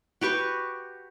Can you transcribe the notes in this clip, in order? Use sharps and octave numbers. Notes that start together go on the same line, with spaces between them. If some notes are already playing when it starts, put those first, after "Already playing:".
F#4 G4 B4 C#6